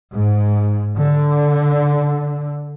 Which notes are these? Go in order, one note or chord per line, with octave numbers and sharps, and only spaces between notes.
G#2
D3